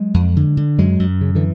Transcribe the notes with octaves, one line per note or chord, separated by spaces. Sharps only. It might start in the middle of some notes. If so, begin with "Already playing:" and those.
Already playing: F#3 G#3
F2
D3
D3
F#2 F#3 G#3
F#2
C#3
D3 E3